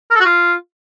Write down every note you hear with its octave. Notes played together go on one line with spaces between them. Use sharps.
A#4
A4
F#4
F4